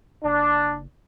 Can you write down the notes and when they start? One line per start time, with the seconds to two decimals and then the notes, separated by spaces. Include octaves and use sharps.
0.24 F#1 D4